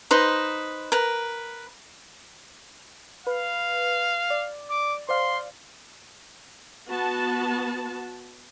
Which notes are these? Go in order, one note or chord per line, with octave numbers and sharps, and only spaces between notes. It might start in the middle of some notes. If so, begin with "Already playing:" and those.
D#4 B4 C5 D#5
A#4 B4
B4 F5
D5
D6
C5 D5 F5 C6
B3 F#4 A5